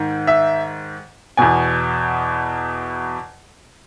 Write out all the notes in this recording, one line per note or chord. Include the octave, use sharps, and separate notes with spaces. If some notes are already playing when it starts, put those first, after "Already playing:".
Already playing: G#2 D#3
E5
E2 B2 G#5